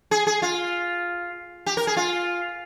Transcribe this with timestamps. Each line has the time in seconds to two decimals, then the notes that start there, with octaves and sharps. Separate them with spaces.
0.11 G#4
0.27 G#4
0.42 F4
1.66 G4
1.77 A#4
1.87 G#4
1.97 F4